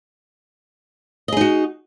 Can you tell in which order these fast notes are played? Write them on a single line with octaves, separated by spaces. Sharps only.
D#5 G#4 D#4 F#4